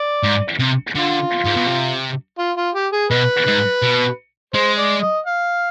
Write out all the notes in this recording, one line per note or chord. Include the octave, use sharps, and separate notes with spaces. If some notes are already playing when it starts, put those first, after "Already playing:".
Already playing: D5
G#2
C3
D3 F4
G#2
B2
C3
F4
F4
G4
G#4
B2 B4
G#2
B2
G#3 C5
D5
D#5
F5